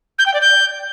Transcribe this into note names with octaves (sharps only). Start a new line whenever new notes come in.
G6
G5
D5
G6